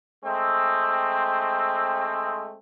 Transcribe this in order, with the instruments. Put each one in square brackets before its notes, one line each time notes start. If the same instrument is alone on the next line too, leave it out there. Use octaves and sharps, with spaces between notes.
[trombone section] G#3 A3 C4